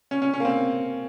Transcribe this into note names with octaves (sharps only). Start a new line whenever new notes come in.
C#4
C#4
C#4
A#3
C4